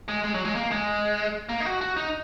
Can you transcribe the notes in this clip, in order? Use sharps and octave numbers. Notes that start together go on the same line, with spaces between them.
G#3
G#3
F#3
G#3
A#3
G#3
A#3
D#4
F#4
F#4
D#4